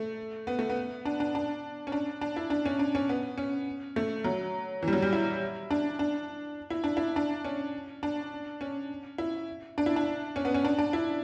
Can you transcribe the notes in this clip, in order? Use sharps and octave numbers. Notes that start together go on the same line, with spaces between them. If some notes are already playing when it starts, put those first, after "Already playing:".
Already playing: A3
B3
A3
B3
D4
D4
D4
C#4
D4
D4
E4
D4
C#4
D4
C#4
B3
C#4
A3
F#3
E3
G3
F#3
G3
E4
D4
D4
E4
D4
E4
D4
C#4
D4
C#4
E4
D4
E4
D4
C#4
B3
C#4
D4
D4
E4